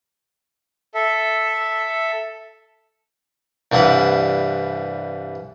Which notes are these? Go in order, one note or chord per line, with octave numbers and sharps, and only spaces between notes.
A4 E5
C2 G2 E3 F#5 D6